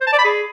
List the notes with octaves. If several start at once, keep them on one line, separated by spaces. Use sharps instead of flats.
C5
A5
D5
B5
G#4